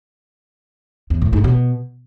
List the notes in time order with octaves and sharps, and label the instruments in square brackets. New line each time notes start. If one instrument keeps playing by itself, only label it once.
[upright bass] E2
A2
G#2
B2